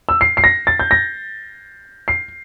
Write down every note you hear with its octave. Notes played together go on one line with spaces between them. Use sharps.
E6
C7
C7
A#6
A6
G6
A#6
C7